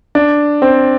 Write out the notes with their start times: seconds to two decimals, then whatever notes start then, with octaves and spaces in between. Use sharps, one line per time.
0.15 D4
0.62 C4